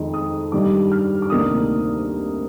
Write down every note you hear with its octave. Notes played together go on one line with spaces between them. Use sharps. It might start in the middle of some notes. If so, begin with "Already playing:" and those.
Already playing: F2 D#3 G#3 D#4
D#6
G2 D#3 G3 D6
F6
D6
D2 C3 D#3 A#3 D4 D#6